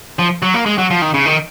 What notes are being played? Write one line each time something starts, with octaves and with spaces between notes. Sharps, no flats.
F3
F#3
A#3
G#3
F#3
F3
D#3
C#3
D#3